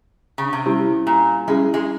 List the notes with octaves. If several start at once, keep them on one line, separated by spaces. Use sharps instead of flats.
C#3
C3
G3 C#4 E4 G4 C5
A#2
G3 G#3 C#4 E4 G#4
G#3